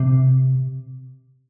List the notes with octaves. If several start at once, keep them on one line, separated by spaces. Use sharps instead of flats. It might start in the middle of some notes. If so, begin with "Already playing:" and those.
Already playing: C3